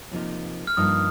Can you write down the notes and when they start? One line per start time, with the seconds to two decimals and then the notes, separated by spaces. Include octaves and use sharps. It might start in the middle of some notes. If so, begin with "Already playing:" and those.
0.11 C3 F3 A#3 D#4
0.67 F6
0.77 G2 F3 A#3 D#4 D#6